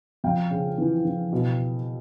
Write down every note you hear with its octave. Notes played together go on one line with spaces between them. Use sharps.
F2 F5 G5
C#3
E3
E3
B2